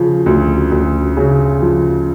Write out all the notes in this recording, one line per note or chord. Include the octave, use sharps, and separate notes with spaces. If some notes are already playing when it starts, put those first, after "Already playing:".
Already playing: C#3 F3
D2
D2
C#3
F3